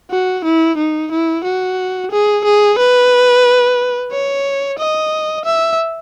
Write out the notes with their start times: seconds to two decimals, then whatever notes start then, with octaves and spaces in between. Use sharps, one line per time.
0.11 F#4
0.44 E4
0.77 D#4
1.12 E4
1.44 F#4
2.11 G#4
2.45 G#4
2.78 B4
4.11 C#5
4.78 D#5
5.45 E5